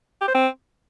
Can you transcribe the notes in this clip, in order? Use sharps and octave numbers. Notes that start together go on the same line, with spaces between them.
G4
C5
C4